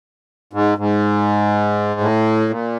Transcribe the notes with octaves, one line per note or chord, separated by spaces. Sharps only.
G#2
G#2
A2
A#2